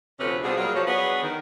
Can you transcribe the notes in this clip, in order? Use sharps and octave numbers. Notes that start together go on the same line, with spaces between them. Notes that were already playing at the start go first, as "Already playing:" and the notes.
D2 C3 F3 C#4 B4
B2 G3 C4 F4 G#4
F#3 G3 A#3 F4 G#4
F3 F#4 C#5
F#3 B3 D4 G#4 B4 C#5
D#3